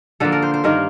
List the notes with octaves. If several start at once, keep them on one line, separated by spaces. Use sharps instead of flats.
D3 F3 A#3 A4
A#4
C5
C5
G2 D#3 A#3 A#4